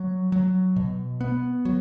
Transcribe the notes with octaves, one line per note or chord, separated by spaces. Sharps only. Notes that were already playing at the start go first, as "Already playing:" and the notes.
Already playing: F#3
F#3
B2
B3
F#3